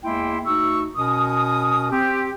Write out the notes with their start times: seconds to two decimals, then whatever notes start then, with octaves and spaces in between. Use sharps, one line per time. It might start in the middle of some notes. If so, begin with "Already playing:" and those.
0.04 E2 G#3 A#3 E4 G5 C6
0.46 D2 D#4 F#4 C#6 E6
0.96 B2 C#4 A#4 D#6
1.91 C4 G4